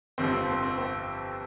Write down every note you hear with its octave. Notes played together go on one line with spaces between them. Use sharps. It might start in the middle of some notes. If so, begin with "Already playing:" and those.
G1 F2 C3 F3 C4
C4
C4
C4
C4